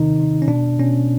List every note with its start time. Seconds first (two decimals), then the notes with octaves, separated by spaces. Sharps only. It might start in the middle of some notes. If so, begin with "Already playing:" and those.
Already playing: C3 D#3 D#4
0.16 C3 D#3
0.42 C#4
0.48 B2 D4
0.79 B2 C#4